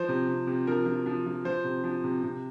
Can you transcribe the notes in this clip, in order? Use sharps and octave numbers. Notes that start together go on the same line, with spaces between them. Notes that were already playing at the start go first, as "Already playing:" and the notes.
Already playing: F3 C5
C3
C3
C3
F3 A#4
F3
F3
F3
F3 C5
C3
F3
C3
C3